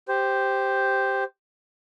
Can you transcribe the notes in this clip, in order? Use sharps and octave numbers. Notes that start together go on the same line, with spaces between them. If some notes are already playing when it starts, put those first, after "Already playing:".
G4 C5